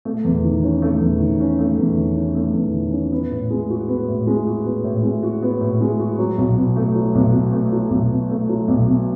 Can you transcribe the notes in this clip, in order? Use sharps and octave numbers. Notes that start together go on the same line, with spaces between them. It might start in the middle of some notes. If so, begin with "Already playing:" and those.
A3
E2
D#3
C#4
A3
E2
D#3
C#4
A3
E2
D#3
C#4
A3
E2
D#3
C#4
B3
A2
G#3
F#4
B3
A2
G#3
F#4
B3
A2
G#3
F#4
B3
A2
G#3
F#4
F#3
B1
B2
A3
F#3
B1
B2
A3
F#3
B1
B2
A3
F#3
B1
B2